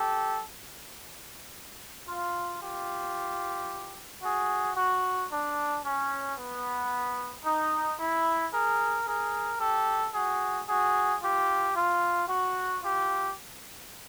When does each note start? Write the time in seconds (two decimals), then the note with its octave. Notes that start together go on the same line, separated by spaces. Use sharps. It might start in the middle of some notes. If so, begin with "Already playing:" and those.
Already playing: G4 A4
2.08 F4
2.61 F4 G4
4.23 F#4 G#4
4.76 F#4
5.31 D4
5.84 C#4
6.38 B3
7.45 D#4
8.00 E4
8.53 G#4 A#4
9.06 G#4 A#4
9.60 G4 A4
10.14 F#4 G#4
10.67 F#4 G#4
11.22 F4 G4
11.75 F4
12.29 F#4
12.83 F4 G4